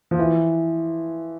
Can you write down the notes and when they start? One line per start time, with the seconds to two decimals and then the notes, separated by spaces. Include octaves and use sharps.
0.11 F3
0.19 E3